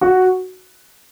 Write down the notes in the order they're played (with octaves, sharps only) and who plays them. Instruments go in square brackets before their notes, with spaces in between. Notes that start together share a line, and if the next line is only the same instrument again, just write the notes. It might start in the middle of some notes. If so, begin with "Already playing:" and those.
[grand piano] F#4